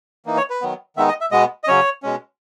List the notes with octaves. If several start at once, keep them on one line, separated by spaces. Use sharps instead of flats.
E3 A#3 D#4
C#5
B4
D#3 F#3 B3
D#3 G#3 B3 D#4 E5
D#5
E5
B2 G#3 B3 D#5
D#5
C#3 F#3 C#4 C#5
B2 G#3 C#4